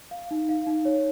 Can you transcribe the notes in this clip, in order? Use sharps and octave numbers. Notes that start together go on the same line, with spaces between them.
F5
D#4
F5
D#4
C#5